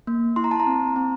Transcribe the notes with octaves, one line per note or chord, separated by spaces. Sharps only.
A#3
E4 C6
A#5
A5
A#5
C4
C4